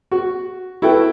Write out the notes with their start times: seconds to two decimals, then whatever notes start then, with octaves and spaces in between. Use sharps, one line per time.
0.11 F#4
0.82 E4 F#4 A4 B4 G5